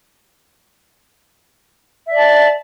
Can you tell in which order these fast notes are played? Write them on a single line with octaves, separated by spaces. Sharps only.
E5 D5 A5